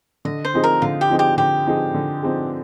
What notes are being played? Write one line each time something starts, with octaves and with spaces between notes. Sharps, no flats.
D3 D#5
C5
F3 C4 D#4 G#4
A#4
D3 F4
G4
F3 C4 D#4 G#4
G4
D3 G4
F3 C4 D#4 G#4
D3
F3 C4 D#4 G#4